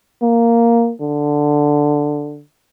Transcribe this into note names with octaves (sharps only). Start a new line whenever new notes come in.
A#3
D3